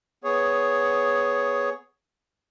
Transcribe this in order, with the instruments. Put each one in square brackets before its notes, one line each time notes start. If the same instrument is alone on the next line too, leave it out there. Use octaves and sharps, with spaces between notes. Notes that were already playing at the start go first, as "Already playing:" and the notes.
[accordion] B3 G#4 C#5